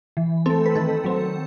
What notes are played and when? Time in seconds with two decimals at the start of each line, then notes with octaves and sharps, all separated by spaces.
0.17 E3
0.46 A3 C4 A4
0.66 B4
0.75 D#3 A4
1.04 F#3 C4